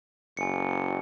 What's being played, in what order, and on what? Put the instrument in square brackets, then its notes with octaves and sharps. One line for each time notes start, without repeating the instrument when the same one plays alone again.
[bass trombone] F#1 [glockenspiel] G#5 C#7